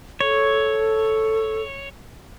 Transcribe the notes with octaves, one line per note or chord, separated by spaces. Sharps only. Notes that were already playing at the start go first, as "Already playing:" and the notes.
A4 C#5